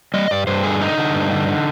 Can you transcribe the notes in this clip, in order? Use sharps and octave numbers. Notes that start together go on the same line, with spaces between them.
G3 D#5
G2 D5
G2 C5
D3 G#4
D3 D#4
D3
G2
D3
D3